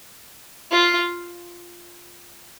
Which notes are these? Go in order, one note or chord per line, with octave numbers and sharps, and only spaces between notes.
F4